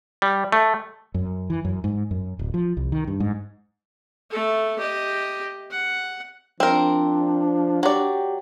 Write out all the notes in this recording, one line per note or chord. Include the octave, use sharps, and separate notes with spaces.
G3
A3
F#2
E3
F#2
G#2
F#2
D1
F3
C2
D#3
G2
G#2
A3 A4
G4 D#5
F#5
F3 C4 D4 A#4
F#3 G4 D5